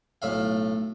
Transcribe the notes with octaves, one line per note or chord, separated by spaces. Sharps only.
B1 A2 E5 F5